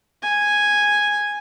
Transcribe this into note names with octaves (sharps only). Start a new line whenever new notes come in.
G#5